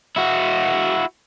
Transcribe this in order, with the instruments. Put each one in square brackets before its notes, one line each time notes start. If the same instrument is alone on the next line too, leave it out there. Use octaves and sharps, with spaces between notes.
[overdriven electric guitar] E4 F#4